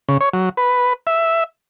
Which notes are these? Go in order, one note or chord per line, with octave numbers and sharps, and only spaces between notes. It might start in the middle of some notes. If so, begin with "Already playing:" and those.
C#3
C#5
F#3
B4
E5